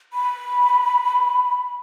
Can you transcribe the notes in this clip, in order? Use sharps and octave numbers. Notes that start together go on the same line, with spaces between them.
B5